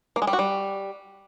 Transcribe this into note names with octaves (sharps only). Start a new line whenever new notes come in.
A#3
G#3
G3
F#4
G3